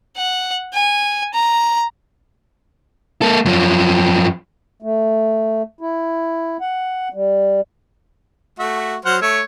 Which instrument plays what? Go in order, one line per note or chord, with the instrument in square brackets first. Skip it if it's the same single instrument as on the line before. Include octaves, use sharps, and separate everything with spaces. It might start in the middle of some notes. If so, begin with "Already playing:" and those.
[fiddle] F#5
G#5
A#5
[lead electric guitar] A#3 A4
F#2 F3
[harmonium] A3
E4
F#5
G3
[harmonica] A3 F#4 E5
[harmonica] F#3 C5 F6 [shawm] F#5
[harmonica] A3 E6 [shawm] C#5